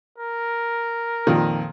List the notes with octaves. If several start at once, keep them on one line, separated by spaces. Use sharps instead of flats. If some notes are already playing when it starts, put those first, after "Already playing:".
A#4
F2 A#2 D#3